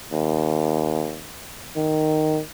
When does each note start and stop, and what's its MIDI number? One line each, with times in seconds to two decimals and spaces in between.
0.12 1.22 39
1.76 2.41 51